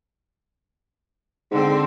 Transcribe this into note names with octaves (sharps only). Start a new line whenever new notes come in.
G#2 D3 C4